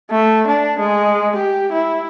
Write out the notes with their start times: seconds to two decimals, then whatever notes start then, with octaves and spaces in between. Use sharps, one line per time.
0.11 A3
0.48 D4
0.80 G#3
1.36 G4
1.72 E4